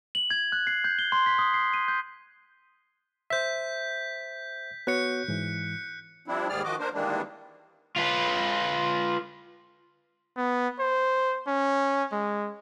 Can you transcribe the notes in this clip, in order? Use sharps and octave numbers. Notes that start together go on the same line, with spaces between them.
F#7
G#6
F#6
C7
G6
G7
C6
B6
D#6
C7
D#7
G6
C5 E5 G6 B6
B3 F#4 C#5 F#6 C#7
G#2 E3
F3 G3 C4 D4 E4
D#2 G#2 G3 G#4 D5 F6
D#3 F3 F#4 D#5 D6
A#3 D4 A#4 C5
D#3 E3 G3 G#3 A#3 D4
F4 B4
B3
C5
C#4
G#3